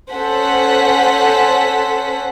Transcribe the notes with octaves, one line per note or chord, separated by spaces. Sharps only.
C#4 A4 C5 F#5 B6